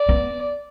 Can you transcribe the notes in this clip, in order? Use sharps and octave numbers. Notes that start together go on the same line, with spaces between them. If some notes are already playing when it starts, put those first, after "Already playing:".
Already playing: D5
B3